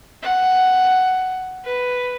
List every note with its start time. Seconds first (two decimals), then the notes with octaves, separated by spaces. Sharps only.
0.21 F#5
1.64 B4